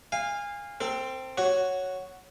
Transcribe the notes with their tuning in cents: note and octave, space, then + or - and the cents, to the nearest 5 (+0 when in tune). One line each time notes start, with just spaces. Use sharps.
F5 +0 G#5 -25
C4 +0 A4 +45
F#4 +0 C#5 +0